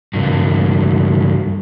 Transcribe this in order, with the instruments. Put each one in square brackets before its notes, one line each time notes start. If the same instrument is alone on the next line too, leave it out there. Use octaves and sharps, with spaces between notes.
[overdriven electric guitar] C#2 G2